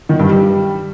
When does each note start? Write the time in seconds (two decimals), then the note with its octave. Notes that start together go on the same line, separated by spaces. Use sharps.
0.09 D#3
0.19 G2
0.29 G3